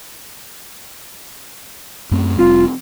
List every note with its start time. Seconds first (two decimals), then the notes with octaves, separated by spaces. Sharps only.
2.11 F#2 A3 C4
2.38 F1 G3 C4 F4